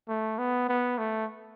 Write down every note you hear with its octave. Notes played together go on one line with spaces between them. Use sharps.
A3
B3
B3
A3